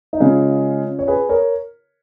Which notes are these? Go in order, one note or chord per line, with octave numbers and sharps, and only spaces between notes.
D#4
C#3 G#3 C#4 F4
C#5
G#4 B4
A#4 C#5